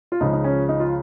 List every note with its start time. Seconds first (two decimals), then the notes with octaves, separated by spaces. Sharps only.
0.12 F4
0.20 C#2 C#3 F3 D#4
0.33 D#4
0.44 C#4
0.69 D#4
0.80 F4